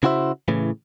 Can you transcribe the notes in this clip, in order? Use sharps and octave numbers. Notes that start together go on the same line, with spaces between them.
C#3 E4 F#4 C5 E5
A2 C#3 E3